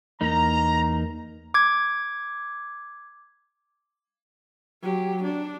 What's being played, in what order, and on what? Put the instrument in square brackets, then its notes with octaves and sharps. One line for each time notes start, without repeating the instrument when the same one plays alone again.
[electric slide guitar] E2 A#3 D#4 [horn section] A#5
[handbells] D6 G#6
[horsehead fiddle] F#3 G4
D4